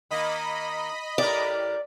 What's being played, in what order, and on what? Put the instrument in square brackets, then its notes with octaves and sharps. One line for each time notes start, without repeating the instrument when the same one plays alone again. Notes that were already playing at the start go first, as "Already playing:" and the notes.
[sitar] D#3 A#3 [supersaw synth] D#5 B5
[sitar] A2 G4 A#4 [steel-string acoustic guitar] D5